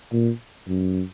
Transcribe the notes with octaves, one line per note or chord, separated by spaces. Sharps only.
A#2
F#2